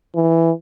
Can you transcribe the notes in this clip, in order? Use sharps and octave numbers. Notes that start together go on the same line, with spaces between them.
E3